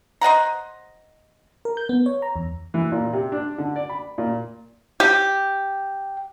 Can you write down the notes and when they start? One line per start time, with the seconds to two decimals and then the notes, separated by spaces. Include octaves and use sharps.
0.21 C5 D#5 F#5 A#5
1.65 A#4
1.77 G6
1.89 B3
2.06 C#5
2.22 A#5
2.36 E2
2.74 E3
2.92 A#2
3.13 C3
3.32 D4
3.58 D3
3.76 D5
3.89 B5
4.18 A#2
5.00 G4